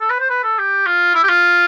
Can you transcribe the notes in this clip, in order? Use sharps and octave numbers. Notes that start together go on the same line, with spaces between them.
A4
B4
C5
B4
A4
G4
F4
E4
G4
F4